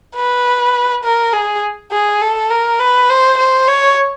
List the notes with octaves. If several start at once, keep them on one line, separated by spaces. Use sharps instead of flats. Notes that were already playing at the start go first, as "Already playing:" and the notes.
B4
A#4
G#4
G#4
A4
A#4
B4
C5
C5
C#5